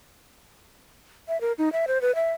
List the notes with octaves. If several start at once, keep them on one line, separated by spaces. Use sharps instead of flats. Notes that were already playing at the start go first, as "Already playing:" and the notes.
E5
A#4
D#4
E5
C5
B4
E5